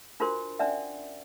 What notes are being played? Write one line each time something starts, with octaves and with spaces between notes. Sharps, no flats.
D4 F4 F#4 A#4 C5 C6
C#4 D4 D5 E5 F#5